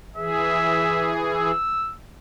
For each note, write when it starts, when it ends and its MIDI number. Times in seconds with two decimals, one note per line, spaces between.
0.16 1.52 52
0.16 1.52 68
0.16 1.13 76
1.32 1.94 88